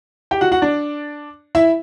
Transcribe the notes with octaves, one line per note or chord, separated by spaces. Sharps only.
G4 G5
F#4 F#5
F#4 F#5
D4 D5
E4 E5